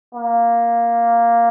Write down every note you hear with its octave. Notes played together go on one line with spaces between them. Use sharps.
A#3